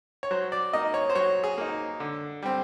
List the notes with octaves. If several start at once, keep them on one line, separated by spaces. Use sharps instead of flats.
C#5
F#3 C5
D5
A#3 D#4 D#5
C#5
C5
F#3 C#5
G#4
A#3 D#4
D3
G3 C4